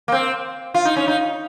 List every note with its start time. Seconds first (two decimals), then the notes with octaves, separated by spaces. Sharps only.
0.08 A#3
0.12 C4
0.74 F4
0.85 D#4
0.96 C#4
1.08 D#4